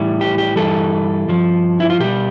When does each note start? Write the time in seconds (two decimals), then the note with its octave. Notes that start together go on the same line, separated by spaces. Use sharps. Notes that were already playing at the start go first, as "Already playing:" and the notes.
Already playing: A2 E3 G3
0.21 G4
0.38 G4
0.56 G2 E3 G3 A4
1.28 G2 F3
1.80 E4
1.90 F4
2.00 B2 G3 G4